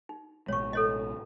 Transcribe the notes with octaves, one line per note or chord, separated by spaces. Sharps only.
D#4
A1 B2 G#3 C#5 C#6
A4 C#5 D#5